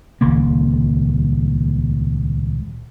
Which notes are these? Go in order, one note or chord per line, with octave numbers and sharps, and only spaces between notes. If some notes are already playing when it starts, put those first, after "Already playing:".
D#1 C#2 A#3